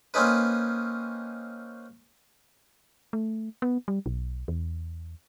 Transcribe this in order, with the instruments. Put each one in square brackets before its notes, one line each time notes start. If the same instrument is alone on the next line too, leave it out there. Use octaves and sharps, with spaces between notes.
[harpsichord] A#3 C4 C#4 D#4 B4
[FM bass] A3
B3
G3
B1
E2